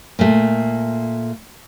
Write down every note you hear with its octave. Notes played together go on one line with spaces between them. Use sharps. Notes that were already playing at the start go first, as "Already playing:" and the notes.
A#2 A3